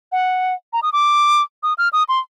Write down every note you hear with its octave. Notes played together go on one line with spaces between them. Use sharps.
F#5
A#5
D#6
D6
D#6
F6
D#6
C6